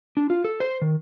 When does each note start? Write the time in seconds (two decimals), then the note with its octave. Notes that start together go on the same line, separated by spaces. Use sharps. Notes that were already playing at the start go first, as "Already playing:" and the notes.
0.17 D4
0.30 F4
0.45 A4
0.60 C5
0.82 D#3